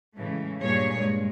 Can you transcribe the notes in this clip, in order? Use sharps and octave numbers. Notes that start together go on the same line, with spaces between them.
A2 C#3 E3 G#3 A3
G2 A#2 G#4 C#5
G2 G#3